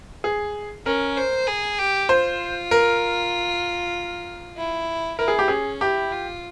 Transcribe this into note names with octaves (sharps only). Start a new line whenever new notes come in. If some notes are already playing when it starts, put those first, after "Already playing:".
G#4
C#4 A#4
C5
G#4
G4
F4 C5
A#4
E4
E4 A#4
G#4
G4
C#4 G#4
E4 G4
F4